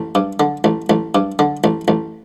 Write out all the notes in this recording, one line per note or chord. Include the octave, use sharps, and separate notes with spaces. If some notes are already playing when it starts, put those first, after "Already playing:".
Already playing: A1
G2
D3
A1
A1
G2
D3
A1
A1